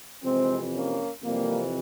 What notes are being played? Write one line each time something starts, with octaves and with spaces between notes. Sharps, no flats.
F2 C3 E3 G#3 C4
A#3 C#4
F2 C3 E3 G3 A#3